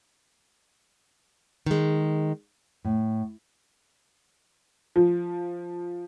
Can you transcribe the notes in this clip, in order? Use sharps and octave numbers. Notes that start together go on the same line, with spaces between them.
D#3 G#3
A2
F3